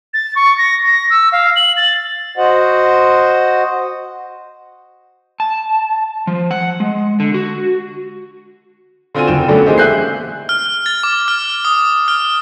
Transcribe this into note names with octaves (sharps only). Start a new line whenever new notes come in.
A6
C#6
A#6
A#6
E6
F5
F#7
A6
F#4 C5 D#5 F#5
A5
F3
F#5
G#3
D3
F#4
D3 C4 F4 F#4 G#5 D#7
F#1 D3 G5 E7
D3 F#3 A3 B3 C#4 D4
E3 G#3 A#3 D#4 G4 C5
E5 G#5 F#6 G6 C7
F6
A6
D6
F6
D#6
F6